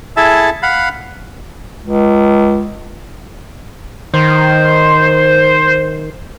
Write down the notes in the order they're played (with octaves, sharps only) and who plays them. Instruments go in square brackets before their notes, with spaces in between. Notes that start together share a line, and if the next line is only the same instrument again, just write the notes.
[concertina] E4 G#4 A4 E5 A5
F5 F#5 B5
[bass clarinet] C#2
[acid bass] D#3 [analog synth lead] C5